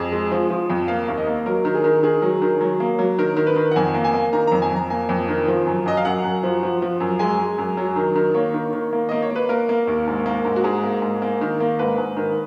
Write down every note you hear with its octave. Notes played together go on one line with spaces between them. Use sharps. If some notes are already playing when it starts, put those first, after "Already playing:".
Already playing: F2 G#4
G#3
F3
F3
F2
A#3 F5
D#2
D#5
A#3
F#3 A#4
D#3
G#4
D#3
D#3 G#4
F#3
D#3
F#3
A#3
F#3
D#3 A#4
D#3
B4
D#3
F#5
F2 G#5
A#3
G#5
A#3
D#3 A#5
F2 A#5
G#5
F2 A#5
A#3 G#5
F2
D#3
F3
F#2
F#2 D#5
F5
F#2 F#5
F#2
F3
F3
F3
F#2
G#3 G#5
G#3
F#2
F#3
D#3
D#3
A#3 C#5
D#3
D#3
A#3
A#3 D#5
C#5
A#3
B4
A#3 A#4
A#3
D#2
G#2
A#3
G#2
F#4
G#2 G#4
A#3
G#2
A#3
D#3
A#3
G#2 B4
G#2
D#3